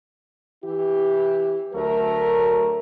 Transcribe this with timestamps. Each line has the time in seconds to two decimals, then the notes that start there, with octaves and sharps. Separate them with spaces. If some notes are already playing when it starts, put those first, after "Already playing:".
0.64 E3 E4 G4
1.73 D2 F#3 A3 A#4